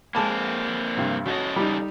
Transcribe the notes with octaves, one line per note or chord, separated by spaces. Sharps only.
G#3 A#3 C4 A5 B5
G2 C3
C#3 F#4 A4 C#5 D#5
G3 D#4